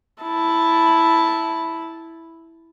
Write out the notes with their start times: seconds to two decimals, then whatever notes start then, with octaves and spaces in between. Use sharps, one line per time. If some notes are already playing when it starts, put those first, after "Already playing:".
0.22 E4 A5